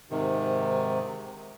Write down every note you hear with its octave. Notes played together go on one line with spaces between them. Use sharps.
G#2 C3 D#3